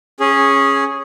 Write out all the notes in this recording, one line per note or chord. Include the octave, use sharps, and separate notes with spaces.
C#4 G#4